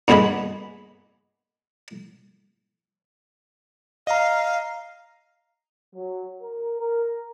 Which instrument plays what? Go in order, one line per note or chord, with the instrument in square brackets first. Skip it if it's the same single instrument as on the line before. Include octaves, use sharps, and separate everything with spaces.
[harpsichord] G2 A#2 B3 G#4 D#5 B5
[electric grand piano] D#5 A#5 [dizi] F5
[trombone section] F#3
A#4
A#4